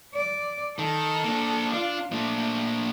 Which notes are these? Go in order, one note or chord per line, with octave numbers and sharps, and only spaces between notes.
D5
D#3 A4
A#3 D4
D4 F4
A#2 A3 D4